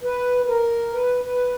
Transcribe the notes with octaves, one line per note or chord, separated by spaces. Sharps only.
B4
B4
A#4
B4
B4